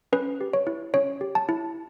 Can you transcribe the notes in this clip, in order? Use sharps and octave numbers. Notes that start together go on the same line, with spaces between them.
C#4 B4
G4
C#5
E4
C#4 C#5
G4
A5
E4